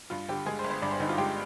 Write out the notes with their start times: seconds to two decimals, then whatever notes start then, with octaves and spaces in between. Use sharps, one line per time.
0.10 G2 F4
0.28 D3 G4
0.46 G#3 G#4
0.59 C5
0.64 G1
0.70 C5
0.82 G2 D5
0.91 C5
1.00 D3 D#4
1.09 F4
1.18 G#3 G4